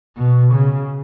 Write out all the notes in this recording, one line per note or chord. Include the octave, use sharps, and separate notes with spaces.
B2
C#3